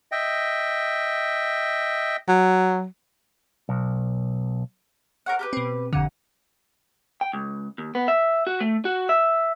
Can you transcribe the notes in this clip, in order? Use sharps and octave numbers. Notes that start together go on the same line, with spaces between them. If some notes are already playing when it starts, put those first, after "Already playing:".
D#5 E5 G5
F#3
B1
A#4 C#5 F#5
G4 A#4 B4
B2 C4
G1 F2 D3 F#5
G5
C#2
D#2
B3
E5
F#4
A3
F#4
E5